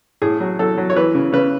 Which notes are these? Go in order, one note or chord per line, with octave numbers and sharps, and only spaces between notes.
A2 G#4
F#3
F#3 A4
F#3
C#5
E3 B4
C#3
C#3 B4